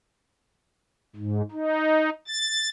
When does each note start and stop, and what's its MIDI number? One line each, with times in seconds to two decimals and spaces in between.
1.16 1.42 44
1.52 2.10 63
2.27 2.69 93